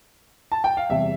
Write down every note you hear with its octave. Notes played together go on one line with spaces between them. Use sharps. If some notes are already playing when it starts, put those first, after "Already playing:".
A5
G5
F5
E2 C3 G3 E5